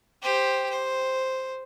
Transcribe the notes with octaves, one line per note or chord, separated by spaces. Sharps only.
G4 C5
C5